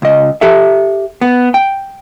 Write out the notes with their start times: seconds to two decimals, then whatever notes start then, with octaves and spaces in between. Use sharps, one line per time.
0.02 C#2 D#5
0.41 G4 A4 E5
1.21 B3
1.54 G5